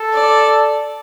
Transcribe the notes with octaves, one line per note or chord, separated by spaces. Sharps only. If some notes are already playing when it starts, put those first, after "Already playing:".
Already playing: A4
D5